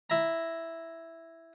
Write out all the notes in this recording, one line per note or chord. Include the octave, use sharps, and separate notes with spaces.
E4 A#5